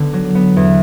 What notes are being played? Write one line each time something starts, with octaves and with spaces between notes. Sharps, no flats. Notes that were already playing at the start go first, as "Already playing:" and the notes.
Already playing: D3 B3
F#3
B3
E2